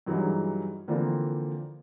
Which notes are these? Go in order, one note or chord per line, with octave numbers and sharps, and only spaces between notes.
G2 E3 F#3 G#3 D#4
D3 E3 F3 A#3 C4 D4